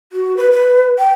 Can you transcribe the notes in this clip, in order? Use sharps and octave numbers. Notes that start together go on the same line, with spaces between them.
F#4
B4
B4
G5